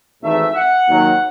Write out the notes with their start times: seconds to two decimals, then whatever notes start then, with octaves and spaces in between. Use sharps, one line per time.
0.23 G#1 G#2 E3 A3 D#4 E5
0.55 F#5
0.88 D#2 D#3 F#3